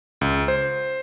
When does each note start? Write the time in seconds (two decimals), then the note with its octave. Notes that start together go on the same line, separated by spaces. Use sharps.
0.21 C#2
0.48 C5